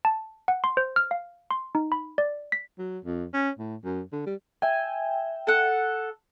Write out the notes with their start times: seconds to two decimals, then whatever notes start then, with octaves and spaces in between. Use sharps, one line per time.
0.05 A5
0.48 F#5
0.64 C6
0.77 C5
0.96 F6
1.11 F5
1.51 C6
1.75 D#4
1.92 B5
2.18 D5
2.52 B6
2.79 F#3
3.05 F2
3.33 C#4
3.59 A2
3.84 F#2
4.12 D3
4.26 G3
4.62 E5 G5 G#5
5.47 A4 F#5